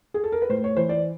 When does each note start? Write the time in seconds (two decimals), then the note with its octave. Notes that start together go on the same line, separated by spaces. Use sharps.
0.14 G#4
0.24 A4
0.32 A#4
0.42 B4
0.49 A2 C5
0.64 C#5
0.76 E3 C5
0.89 D5